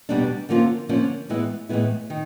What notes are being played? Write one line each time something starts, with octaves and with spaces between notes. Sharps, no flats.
E2 B2 G3 B3 D4
D3 F3 A#3 C#4 F4
D3 F3 A#3 C#4 F4
A2 E3 G#3 B3 E4
A2 E3 G#3 B3 E4
D#3